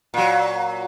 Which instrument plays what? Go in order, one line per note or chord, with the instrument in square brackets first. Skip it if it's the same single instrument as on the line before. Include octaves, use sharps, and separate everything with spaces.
[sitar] A#2 F#3